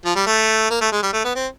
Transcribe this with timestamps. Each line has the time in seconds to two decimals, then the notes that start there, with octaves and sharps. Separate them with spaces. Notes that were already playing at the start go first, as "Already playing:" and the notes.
0.05 F3
0.15 G3
0.26 A3
0.70 A#3
0.81 A3
0.92 G#3
1.03 G3
1.13 A3
1.24 B3
1.35 C4